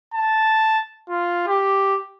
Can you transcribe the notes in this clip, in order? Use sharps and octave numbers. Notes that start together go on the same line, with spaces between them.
A5
F4
G4